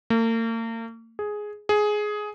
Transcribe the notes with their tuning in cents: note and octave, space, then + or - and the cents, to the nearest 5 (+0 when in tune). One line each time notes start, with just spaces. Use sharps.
A#3 -45
G#4 +5
G#4 +10